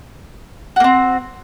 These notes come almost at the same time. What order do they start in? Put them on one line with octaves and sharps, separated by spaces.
F#4 A#3 C4